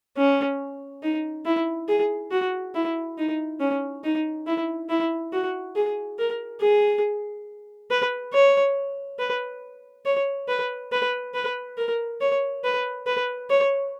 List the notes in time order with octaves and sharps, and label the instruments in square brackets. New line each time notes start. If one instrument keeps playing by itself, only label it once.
[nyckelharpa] C#4
D#4
E4
G#4
F#4
E4
D#4
C#4
D#4
E4
E4
F#4
G#4
A#4
G#4
B4
C#5
B4
C#5
B4
B4
B4
A#4
C#5
B4
B4
C#5